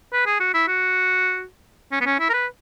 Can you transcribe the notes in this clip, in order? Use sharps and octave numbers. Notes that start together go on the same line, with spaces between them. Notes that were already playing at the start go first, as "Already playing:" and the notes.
B4
G#4
F#4
E4
F#4
C#4
B3
C#4
E4
A#4
B4